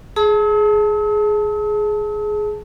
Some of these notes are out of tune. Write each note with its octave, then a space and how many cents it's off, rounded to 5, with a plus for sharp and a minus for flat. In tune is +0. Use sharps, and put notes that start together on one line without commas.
G#4 +15 A5 +0 E6 -45